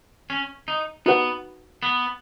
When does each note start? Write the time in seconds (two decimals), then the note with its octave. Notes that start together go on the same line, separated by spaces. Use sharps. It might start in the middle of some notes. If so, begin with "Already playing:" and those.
0.30 C#4
0.68 D#4
1.06 B3 D#4 F#4 B4 F#5
1.83 B3